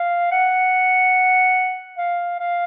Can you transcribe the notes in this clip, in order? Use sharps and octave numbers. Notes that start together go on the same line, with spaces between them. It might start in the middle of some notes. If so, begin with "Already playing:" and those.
Already playing: F5
F#5
F5
F5